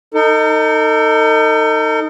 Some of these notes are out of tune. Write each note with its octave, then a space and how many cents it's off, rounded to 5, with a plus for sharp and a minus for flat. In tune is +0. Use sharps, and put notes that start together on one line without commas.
D#4 +0 A4 +40